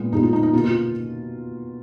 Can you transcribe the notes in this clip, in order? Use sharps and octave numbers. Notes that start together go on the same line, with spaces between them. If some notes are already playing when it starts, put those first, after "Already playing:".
Already playing: A#2 G#3 B3
A#2 G#3 B3 D#4
F4
D#4
D#4
B2 A#3 F4
F4